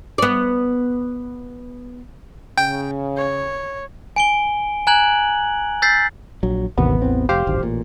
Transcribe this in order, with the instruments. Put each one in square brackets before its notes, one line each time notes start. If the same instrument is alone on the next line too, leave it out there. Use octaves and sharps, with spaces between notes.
[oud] B3 D5
[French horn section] C#3 [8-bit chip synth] G5
[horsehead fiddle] C#5
[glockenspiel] G#5 D7 G7
G#5 A#5 F#6 G#6 F#7
E6 G6 A6 B6 C7
[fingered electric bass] A#1 F#3
[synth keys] A1 B3 [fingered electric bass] D#2 C3 A#3
[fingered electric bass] E2 C4
[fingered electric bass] F1 [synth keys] G4 C5 F5
[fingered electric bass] D1 G#1
A1 A#2